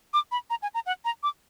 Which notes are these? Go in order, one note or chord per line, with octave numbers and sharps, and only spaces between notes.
D6
B5
A#5
G#5
A#5
F#5
A#5
D6